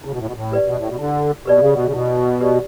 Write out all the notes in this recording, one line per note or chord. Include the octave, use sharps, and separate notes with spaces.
C#3 E4
B2
A2
B2
A2
G4 B4 D5
B2
A2
B2
D3 E4
B2 G4 B4 D5
C#3
B2
C#3
B2 E4
G4 B4 D5